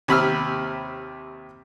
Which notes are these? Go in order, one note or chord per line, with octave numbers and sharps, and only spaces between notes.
D#2 C3 B5 E6 F6